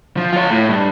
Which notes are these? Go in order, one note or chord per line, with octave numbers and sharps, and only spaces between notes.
F3
F4 C#5
A2
G2